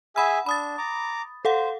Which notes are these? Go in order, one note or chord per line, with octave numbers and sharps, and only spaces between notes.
G#4 E5 F#5 G#5 B5 E6
D4 B5 D#6 A6
A#5 D6
A4 C5 F5 F#5